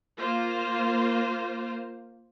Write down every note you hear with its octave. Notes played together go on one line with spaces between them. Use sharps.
A#3 F4 C5